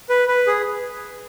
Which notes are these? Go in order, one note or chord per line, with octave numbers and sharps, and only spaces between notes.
B4
B4
G#4